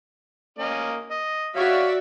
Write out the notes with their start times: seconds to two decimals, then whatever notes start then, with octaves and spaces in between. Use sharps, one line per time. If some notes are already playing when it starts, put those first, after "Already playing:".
0.59 A#3 C#4 D#5
1.11 D#5
1.56 F#4 C#5 D5 E5 F5